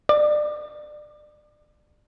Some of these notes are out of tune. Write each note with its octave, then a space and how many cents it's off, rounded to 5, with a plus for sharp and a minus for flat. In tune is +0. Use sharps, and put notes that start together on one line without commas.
D5 +30